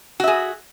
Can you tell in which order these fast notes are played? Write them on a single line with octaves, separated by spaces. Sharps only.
F#4 E5 G#4